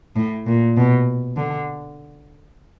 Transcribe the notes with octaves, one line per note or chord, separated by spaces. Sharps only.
A2
A#2
B2
D3